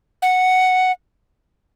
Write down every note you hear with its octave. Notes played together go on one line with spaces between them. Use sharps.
F#5